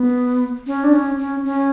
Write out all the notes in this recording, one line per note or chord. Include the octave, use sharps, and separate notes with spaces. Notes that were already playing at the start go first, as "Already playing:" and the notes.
Already playing: B3
C#4
D4
C#4
C#4
C#4